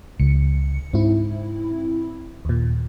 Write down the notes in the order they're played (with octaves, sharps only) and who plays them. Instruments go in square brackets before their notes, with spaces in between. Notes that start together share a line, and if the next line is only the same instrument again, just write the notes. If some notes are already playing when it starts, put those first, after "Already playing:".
[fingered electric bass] C#2 [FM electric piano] C#7
[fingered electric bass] G#2 [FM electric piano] C4 E4
[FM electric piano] D#2 A#2